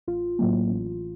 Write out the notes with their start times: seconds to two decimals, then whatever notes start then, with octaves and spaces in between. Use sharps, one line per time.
0.07 A1 F4
0.39 A2 F#3 A#3
0.70 A1